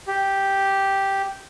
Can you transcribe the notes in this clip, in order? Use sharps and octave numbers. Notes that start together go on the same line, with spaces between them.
G4